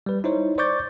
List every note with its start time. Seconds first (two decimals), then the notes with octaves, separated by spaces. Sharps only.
0.06 G3 B4
0.24 D#4 E4 C5 C#5
0.58 C5 D5 C#6 D6 G6 A6